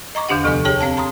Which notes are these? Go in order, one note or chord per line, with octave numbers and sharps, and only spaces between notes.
D#5 A#5 C#6 D6
E2 D3 D4 G4 F#5
D2 C3 F3 B3
G4 G#4 C#5 G5 A5
C4 F5 A5
A#5 C6 D#6